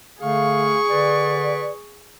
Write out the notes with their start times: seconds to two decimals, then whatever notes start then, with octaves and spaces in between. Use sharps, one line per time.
0.21 D3 A3 G#4 F5 C#6
0.89 D3 B4 D5